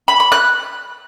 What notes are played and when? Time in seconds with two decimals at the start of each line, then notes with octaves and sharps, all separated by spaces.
0.08 B5
0.20 B5
0.32 F#6